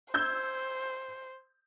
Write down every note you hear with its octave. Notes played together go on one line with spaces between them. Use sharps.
C5 E6 G6 G#6